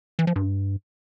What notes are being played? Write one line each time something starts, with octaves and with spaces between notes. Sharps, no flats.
E3
F3
G2